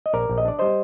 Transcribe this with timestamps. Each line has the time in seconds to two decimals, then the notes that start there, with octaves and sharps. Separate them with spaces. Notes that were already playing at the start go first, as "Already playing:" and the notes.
0.06 D#5
0.13 A#1 A#4 D5
0.30 A#1
0.38 D#5
0.45 D4 D5
0.59 G3 C5 D#5